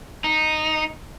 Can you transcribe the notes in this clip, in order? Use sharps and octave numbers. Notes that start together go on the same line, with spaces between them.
D#4